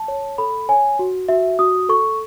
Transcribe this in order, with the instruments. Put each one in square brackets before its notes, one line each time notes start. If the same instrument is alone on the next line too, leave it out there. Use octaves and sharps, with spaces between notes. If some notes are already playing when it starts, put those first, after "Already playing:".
Already playing: [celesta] A5
C#5
A4 B5
C#5 G#5
F#4
F#4 E5
F#4 D#6
A4 C#6